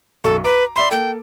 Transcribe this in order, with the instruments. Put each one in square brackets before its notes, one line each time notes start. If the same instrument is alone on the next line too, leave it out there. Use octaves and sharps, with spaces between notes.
[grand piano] B1 F#2 C#6 [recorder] A4
[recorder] B4 [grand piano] A#5 D6 D7
[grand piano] D5 E5 B5 [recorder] C6
[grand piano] A#3 A4 [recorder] G5